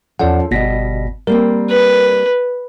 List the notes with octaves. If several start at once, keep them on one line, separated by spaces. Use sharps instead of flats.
E2 F3 C#4 A4 D5 F#5
G1 B2 G3 D#5 A#6 B6
G3 A#3 C4 A#4
B4